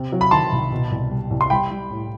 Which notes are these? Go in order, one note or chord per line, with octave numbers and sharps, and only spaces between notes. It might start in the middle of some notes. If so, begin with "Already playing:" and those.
Already playing: C3
F#3
B5
D#3 A5 C6
C2
B2
C2
G3
C2
C6
G3 G5 B5
G3
A2